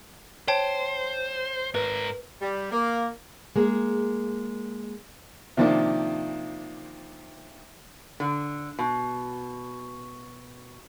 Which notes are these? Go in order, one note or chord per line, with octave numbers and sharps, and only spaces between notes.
C5 C#5 G5 A5
G#2 A#4 B4
G3
A#3
G#3 A#3 G#4
C3 D#3 F3 A#3 D4
D3
B2